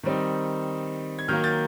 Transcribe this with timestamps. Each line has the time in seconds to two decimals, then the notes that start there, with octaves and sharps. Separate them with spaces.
0.03 D#3 G3 C4 D#4
1.19 G#6
1.28 D#3 F#3 A#3 F6 G6
1.44 G6 A6